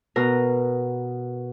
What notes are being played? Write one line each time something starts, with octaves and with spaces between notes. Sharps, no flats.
B2 A#4 A#5